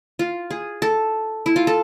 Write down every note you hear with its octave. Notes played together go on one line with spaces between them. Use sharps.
F4
G#4
A4
E4
F4
A4